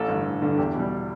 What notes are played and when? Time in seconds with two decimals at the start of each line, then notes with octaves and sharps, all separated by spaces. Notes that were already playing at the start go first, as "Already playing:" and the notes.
Already playing: A1 A4
0.09 G2 D3
0.26 A1
0.42 G2 D3
0.58 E2 G4
0.74 B2
0.79 G3